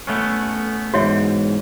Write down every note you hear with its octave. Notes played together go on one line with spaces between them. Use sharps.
A3 B3 C#4
E2 G#2 F#4 C#5 E5